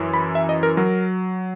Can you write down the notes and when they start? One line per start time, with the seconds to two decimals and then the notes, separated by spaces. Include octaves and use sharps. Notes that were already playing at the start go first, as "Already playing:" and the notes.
Already playing: F#2 E3
0.14 B5
0.35 E5
0.49 D#5
0.63 A#4
0.77 F#3 A#4